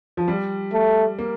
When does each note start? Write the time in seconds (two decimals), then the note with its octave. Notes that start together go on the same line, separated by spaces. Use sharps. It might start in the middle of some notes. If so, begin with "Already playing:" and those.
0.17 F3
0.28 G3
0.73 A3
1.18 A#3